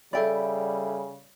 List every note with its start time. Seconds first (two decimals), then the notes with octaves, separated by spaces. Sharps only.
0.13 C#3 G3 A4 D5 E5 G5 B5